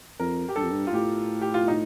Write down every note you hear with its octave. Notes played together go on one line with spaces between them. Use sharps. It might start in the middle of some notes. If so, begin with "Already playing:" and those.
F2 A#4
G4
G2 A4
F2
G2
F4
A2 G4
G4
F4
D#4